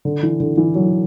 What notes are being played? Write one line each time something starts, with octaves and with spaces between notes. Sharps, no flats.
D3
E3
D3
E3
F#3